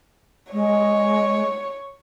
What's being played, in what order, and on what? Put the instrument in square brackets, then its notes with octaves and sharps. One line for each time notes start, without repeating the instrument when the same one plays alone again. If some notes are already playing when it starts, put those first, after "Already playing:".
[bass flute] G#3 [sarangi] C#5